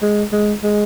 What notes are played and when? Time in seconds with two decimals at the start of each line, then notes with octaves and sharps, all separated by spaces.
0.02 G#3
0.33 G#3
0.64 G#3